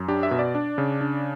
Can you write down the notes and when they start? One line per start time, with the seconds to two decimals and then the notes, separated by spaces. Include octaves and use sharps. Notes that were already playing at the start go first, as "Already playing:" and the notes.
Already playing: F#2
0.08 D4 G4
0.23 E5
0.31 B2
0.39 D5
0.55 D4
0.78 C#3
1.01 D4